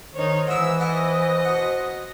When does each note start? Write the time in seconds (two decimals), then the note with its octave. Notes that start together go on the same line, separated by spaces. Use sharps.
0.14 D#3 D#4 C5 C#5
0.47 G#2 E3 E4 E6
0.80 B3 E4 A4 C5 D#5
1.45 B2 F#5